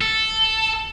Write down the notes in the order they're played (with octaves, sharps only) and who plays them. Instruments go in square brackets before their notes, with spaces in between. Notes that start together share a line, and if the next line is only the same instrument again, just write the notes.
[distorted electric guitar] A4